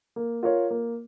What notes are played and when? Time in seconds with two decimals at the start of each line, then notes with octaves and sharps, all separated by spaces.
0.16 A#3
0.43 F4 A#4 C#5
0.71 A#3